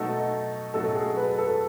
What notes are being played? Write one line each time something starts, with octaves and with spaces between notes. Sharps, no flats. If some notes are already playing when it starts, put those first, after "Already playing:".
Already playing: B2 F#3 A3 D#4 A4
B2 F#3 A3 D#4 A4
G#4
B4
A4